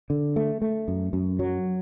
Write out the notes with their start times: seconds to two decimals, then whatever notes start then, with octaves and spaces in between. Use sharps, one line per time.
0.10 D3
0.36 A3
0.62 A3
0.88 F#2
1.13 F#2
1.39 F#3